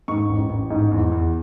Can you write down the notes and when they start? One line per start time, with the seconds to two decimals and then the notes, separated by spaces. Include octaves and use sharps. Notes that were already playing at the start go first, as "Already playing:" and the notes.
0.08 G#2 C#6
0.29 A1
0.50 A1
0.71 G#2
0.91 E2
1.12 E2